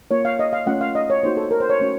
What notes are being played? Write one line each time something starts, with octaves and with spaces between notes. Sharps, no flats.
A#3 F4 C#5
F5
D#5
F5
A3 C#4 F4 F#5
F5
D#5
C#5
A#3 D#4 F#4 C5
A4
A#4
C5
C#5
A3 C#4 F#4